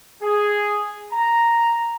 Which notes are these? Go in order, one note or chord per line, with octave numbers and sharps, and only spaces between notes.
G#4
A#5